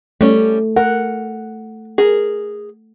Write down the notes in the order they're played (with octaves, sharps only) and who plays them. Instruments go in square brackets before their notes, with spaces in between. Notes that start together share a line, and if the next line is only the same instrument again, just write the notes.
[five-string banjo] G3 C#4 [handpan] A3
[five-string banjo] A#4 [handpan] F#5
[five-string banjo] G#4 A#4